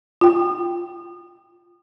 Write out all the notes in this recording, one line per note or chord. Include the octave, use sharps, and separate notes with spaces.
F4 G5